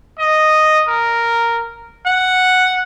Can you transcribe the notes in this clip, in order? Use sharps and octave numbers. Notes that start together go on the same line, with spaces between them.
D#5
A#4
F#5